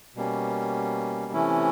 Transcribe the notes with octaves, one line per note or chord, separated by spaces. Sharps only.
B2 G3 A#3 C#4
C3 E3 A3 C#4 E4